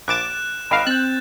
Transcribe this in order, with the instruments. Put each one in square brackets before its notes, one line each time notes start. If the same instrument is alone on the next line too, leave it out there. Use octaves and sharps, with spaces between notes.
[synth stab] A#1 D6 A6 [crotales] F#6 E7
[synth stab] G#1 F5 [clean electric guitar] D#5 G5 B5
[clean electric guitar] C4 [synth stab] F#6 [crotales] G6 A6